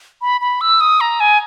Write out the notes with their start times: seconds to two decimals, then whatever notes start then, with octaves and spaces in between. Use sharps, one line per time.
0.21 B5
0.41 B5
0.61 E6
0.81 D#6
1.01 A#5
1.20 G#5